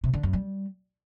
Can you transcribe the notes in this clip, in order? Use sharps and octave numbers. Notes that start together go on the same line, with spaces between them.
C3
D3
F#2
G3